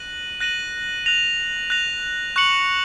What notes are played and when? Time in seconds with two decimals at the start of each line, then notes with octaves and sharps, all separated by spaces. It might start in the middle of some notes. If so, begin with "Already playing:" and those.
Already playing: F#6 A#6 D#7 F#7
0.40 F#6 A#6 D#7 F#7
1.06 F#6 A#6 F7
1.70 F#6 A#6 F7
2.36 C#6 F#6 C#7 F#7